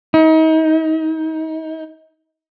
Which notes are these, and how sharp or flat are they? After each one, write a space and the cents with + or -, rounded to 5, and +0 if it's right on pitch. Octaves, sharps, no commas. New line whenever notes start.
D#4 +35